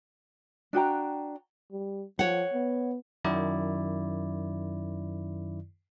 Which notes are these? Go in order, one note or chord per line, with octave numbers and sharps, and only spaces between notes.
D4 F#4 G5 A#5
G3
F3 C#5 F#5
B3
F#2 D#3 E4 D5